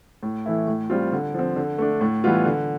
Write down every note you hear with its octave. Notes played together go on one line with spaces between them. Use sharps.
A2
E3 A3 E4
A2
G3 C4 F4
D3
F3 C4
D3
A3 D4
A2
E3 G3 B3 F4
D3